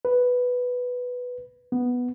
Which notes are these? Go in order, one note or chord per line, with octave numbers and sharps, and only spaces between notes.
B4
B3